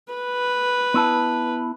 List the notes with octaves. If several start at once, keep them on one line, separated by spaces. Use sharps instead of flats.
B4
B3 E4 A5